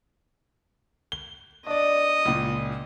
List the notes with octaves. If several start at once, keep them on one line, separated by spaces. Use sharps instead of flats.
G7
D4 D5 D#5
C#2 A#2